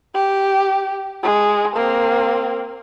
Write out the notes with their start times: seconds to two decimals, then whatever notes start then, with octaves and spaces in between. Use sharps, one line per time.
0.15 G4
1.23 G#3
1.76 A#3 C4